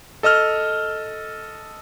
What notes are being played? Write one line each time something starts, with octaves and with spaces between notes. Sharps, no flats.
A4 D#5 E6 F6